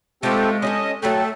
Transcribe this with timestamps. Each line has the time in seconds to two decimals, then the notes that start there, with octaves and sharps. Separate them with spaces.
0.23 G#3 A3 C4 F4 G4 A4
0.62 C#4 G#4 A4 D#5
1.03 F#3 A3 A4 G5